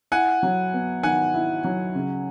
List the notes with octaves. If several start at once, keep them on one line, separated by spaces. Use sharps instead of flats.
E4 F#5 G#5
F#3
B3
D#3 F#5 G#5
E4
F#3
C#3